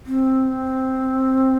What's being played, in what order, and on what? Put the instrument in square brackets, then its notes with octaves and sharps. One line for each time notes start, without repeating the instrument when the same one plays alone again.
[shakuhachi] C4